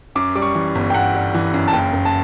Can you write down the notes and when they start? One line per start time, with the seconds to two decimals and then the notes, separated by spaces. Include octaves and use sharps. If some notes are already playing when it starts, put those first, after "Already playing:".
0.15 F#2 D6
0.35 G3 D6
0.42 C#6
0.55 E3
0.75 G1
0.90 G5
0.94 G1 F#5
1.15 G3
1.34 E3
1.54 F#2
1.68 A5
1.73 F#1 G5
1.93 F#1
2.05 A5